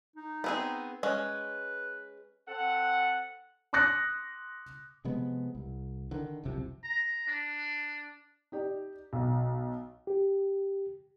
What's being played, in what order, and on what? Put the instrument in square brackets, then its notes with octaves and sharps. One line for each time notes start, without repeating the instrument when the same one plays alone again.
[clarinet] D#4
[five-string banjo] B3 C4 G#4
[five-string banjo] G#3 C#4 [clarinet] B4
[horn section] C4 A4 F#5
[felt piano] C6 D6 D#6 F#6 A#6 C#7
[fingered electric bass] C3 F3 G#3 B3
C2
D3 D#3
F#1 C2 C3 F3
[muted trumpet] A#5
D4
[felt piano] D#4 G4 D5
B1
[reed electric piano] G4